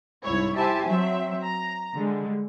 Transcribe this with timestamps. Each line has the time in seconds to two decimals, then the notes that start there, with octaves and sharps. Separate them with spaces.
0.24 C2 G#2 E4 C#5
0.56 E4 G4 C5 E5 G#5 A5
0.87 F#3 C4 E5
1.43 A#5
1.95 D3 G3 G#3